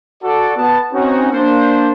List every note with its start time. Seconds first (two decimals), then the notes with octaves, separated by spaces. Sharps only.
0.24 F#4 A4 D5
0.57 B3 A5
0.93 C4 C#4 D#4 F#4
1.32 A#3 D4 C5